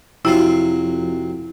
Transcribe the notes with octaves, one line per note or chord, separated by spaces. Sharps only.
F2 C3 F#3 E4 F4